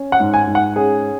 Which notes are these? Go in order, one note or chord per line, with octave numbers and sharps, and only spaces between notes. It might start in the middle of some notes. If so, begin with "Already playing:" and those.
Already playing: C#4
F#5
G#2
G#5
G#2
F#5
C#4 G#4